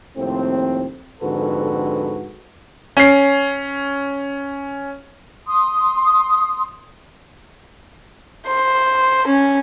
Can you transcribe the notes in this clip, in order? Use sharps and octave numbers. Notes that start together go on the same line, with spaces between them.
D#2 A2 F3 C4
F2 G#2 D3 F#4 A4 B4
C#4 C7
C6 D#6
C5
C#4